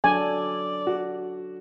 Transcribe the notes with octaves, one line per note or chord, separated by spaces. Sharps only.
F#3 D4 A4 D5 G#5
F#4